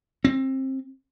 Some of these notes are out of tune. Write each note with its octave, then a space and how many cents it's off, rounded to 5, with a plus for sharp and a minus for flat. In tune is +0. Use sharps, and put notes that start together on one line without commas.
C4 +25